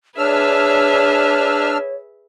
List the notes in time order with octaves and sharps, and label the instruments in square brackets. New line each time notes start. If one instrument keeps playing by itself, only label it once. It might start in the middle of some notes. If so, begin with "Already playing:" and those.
[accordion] D4 E6 F6 [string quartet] G#4 B4 E5 [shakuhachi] C#5